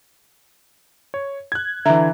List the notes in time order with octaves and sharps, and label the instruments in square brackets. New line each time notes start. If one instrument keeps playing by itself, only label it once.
[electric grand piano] C#5
F#6 G#6
[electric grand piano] D3 E3 [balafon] E5 A#5